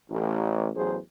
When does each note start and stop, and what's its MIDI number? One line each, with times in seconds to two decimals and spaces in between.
0.11 0.69 33
0.75 0.97 33
0.75 0.97 40
0.75 0.97 54
0.75 0.97 68
0.75 0.97 72